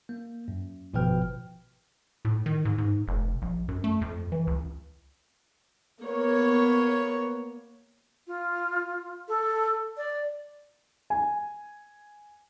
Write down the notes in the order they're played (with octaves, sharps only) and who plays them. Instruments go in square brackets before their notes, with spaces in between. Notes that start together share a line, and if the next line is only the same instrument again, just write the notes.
[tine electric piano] A#3
F#2
G#1 B2 F3 B4 G5 F6
[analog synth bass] A2
D#3
G#2
G#2
F1
A#1
F#2
A3
F2
E3
C#2
[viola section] A#3 B3 C#5
[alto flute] F4
A4
D5
[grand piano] G#5